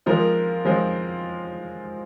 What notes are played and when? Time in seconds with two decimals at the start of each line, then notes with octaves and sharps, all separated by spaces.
0.06 F3 G#3 C4 F4 A#4
0.65 F3 G#3 C4 F4